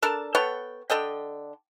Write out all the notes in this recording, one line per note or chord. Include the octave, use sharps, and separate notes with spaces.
D4 A4 A#4 A5
B3 A4 C#5 G5
D3 A4 D#5 G5